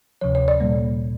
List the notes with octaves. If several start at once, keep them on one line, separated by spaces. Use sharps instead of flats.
D2 C3 F3 C#5
C#5
D5
A#2 G3 A#3